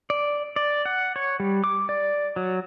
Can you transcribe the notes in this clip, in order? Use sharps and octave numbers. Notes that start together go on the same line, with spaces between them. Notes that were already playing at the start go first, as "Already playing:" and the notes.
D5
D5
F#5
C#5
G3
D6
D5
F#3